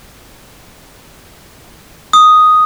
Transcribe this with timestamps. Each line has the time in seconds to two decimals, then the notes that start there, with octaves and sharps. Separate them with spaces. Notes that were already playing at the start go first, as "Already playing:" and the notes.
2.13 D#6